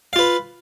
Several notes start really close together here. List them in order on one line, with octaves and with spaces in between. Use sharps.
F5 F4 B4